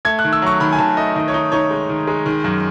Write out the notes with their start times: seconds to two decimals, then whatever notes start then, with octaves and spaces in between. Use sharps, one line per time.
0.05 A3 G#6
0.19 F#6
0.24 D#3
0.33 E6
0.42 F#3 C#6
0.60 D#3 B5
0.73 G#5
0.79 D#3 A5
0.97 A3 D#5
1.16 D#3 D#5
1.28 C#5
1.34 D#4
1.52 D#4 C#5
1.71 G#3
1.89 D#3
2.08 G#3
2.26 D#3
2.44 F#2